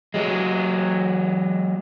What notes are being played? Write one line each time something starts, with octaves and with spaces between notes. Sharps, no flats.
F#3 G#3